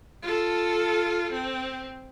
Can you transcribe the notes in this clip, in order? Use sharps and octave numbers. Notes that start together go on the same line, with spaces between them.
F4 A4
C4